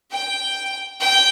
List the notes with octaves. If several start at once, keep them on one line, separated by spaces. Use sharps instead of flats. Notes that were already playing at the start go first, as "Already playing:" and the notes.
G5
G5